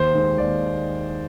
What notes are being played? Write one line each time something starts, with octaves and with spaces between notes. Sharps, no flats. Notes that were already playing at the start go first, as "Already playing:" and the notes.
Already playing: D#2 C5
D#3 G#3
D#2 D5